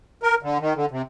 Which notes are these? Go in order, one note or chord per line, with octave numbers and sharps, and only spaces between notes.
A#4
D3
D#3
D3
C3